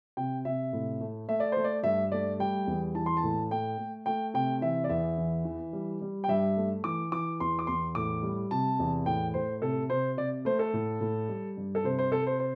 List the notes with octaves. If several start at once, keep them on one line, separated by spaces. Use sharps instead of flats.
C3 G5
C3 E5
A2
A3
A3 E5
D5
A3 C5
D5
G2 E5
A3 D5
G3 G5
E2
E3 A5
C6
A5
A2
A3 G5
A3
A3 G5
C3 G5
E3 E5
D5
E2 E5
E3
E3
G3
G3
G5
G2 E5
A3
E3 D6
E3 D6
E2 C6
D6
E2 C6
A2 D6
G3
C3 A5
E2
A2 G5
A2 C5
C3 A4
C3 C5
C3 D5
A3 C5
A4
A2
A2
G3
G2
A4
C3 C5
C5
C3 A4
C5
C5